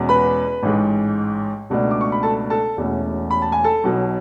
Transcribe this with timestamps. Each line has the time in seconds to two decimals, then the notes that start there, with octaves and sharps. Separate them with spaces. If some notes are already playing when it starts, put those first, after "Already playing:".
Already playing: E2 B2 G#3 C#4
0.09 B4 B5
0.63 A1 G#2 G#3
1.70 C#2 B2 A3 D4
1.91 D6
2.01 C#6
2.12 B5
2.23 A4 A5
2.50 A4 A5
2.77 E1 E2 B2 A3 C#4
3.31 B5
3.42 A5
3.52 G#5
3.64 A4 A5
3.84 B1 B2 F#3